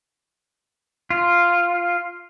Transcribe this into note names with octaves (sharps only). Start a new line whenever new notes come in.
F4